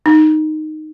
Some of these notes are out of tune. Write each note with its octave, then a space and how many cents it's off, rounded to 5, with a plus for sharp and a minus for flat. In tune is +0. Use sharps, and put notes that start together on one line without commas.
D#4 -5